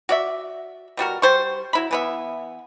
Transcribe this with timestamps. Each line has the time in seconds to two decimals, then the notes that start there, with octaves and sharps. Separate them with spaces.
0.09 F#4 D5 E5
0.97 B2 G3 F#4 A#4
1.22 G3 C5 C#6
1.73 F#3 E4 B5
1.91 E3 B3 E5